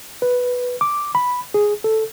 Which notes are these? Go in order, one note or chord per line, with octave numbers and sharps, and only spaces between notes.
B4
D6
B5
G#4
A4